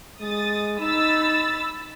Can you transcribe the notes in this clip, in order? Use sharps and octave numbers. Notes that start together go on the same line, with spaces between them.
G#3 D#6 A6
D#4 B5 E6 A6